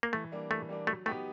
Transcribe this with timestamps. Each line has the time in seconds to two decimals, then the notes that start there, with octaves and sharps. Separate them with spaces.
0.03 A#3
0.13 E3 A3
0.32 G3 A#3 D4
0.50 E3 A3
0.69 G3 A#3 D4
0.87 F#3 A3
1.06 A3 B3 D#4 G4